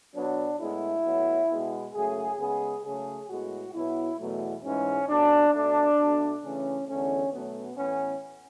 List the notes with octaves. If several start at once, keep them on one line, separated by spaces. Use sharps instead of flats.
B2 F#3 B3 D4
A2 G#3 B3 E4
A2 F#3 B3
B2 G#3 B3
F#2 C#3 F#3 A3 G#4
C#3 G#3 B3 G#4
C#3 F#3 A3 G#4
A2 G#3 B3 F#4
B2 F#3 B3 E4
E2 B2 F#3 A3
G#2 E3 G#3 C#4
B2 A3 D4
B2 A3 D4
B2 A3
C#3 E3 A3 C#4
E2 D3 A3 C#4
B2 F#3 A3 B3
A2 E3 B3 C#4